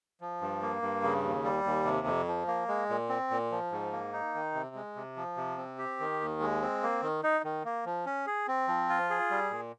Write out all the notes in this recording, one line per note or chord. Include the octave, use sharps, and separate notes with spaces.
F3
G2
A#3
G2
C#3
D#2
G3
D#2
C3
F2
F3
A#3
G#3
A#2
C4
A#2
F3
G#2
A#3
D#4
D#3
C3
G#3
C3
F3
C3
C4
G4
D#3
D#2
G#3
C4
A#3
D#3
D#4
D#3
A#3
F3
C#4
G#4
C4
F3
F4
G#4
G3
A#2